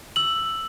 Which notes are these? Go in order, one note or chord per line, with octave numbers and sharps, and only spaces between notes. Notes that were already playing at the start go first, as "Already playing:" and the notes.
E6 F#7